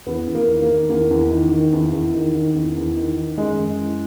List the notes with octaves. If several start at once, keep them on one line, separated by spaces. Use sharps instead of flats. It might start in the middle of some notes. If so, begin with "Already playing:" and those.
E2 B3
E2
A#3
D#3
A#3
D#3
E2 A#3
E2
D#3
D#3
E2
E2
D#3
D#3
E2
E2
D#3
D#3
F#2 G#3
F#2
E3